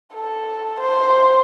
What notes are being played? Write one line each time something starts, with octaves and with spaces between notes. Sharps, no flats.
A4
C5